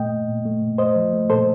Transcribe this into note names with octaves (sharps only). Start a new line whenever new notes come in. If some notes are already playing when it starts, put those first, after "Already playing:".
Already playing: A#2 A3 D#5 G5
A#2
A#2
A3
A#2
A3 C5 D#5
F3
A3
A#2 A4 C5